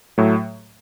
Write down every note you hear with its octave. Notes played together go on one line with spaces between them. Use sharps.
A2 F#3 A3